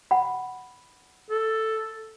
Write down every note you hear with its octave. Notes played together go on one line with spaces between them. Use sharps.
F#5 B5
A4